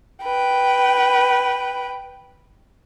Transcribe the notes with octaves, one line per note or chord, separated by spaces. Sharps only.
B4 G5